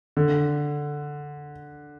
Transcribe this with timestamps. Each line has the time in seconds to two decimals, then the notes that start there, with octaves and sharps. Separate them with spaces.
0.17 D3